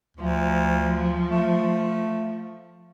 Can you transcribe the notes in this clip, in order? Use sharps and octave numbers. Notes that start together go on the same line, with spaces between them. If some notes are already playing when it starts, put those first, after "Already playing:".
D2 F3
A3